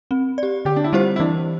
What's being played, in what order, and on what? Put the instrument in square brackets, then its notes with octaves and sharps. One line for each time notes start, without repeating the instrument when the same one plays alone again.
[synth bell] C4
G4 D5
[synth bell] D3 [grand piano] G4
[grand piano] D4
E4
[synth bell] G3 C4 G4 C5 [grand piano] F4
[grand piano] E4
[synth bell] E3 [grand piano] D4